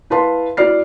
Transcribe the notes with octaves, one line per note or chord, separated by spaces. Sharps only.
E4 B4 F5 A5 C6
E4 F#4 D5 F6 C7